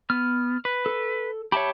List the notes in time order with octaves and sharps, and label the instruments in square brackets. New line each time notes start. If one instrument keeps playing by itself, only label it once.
[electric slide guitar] B3 [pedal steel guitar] F6
[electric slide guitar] B4
[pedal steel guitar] A4
[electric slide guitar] G4 C#5 [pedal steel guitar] E5 A5 B5